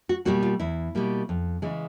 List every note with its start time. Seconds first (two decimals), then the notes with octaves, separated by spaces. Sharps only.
0.09 F#4
0.25 B2 G3 A#3 F#4
0.42 F4
0.60 E2 E4
0.95 B2 G3 A#3
1.29 F2
1.62 C#3 E3 G#3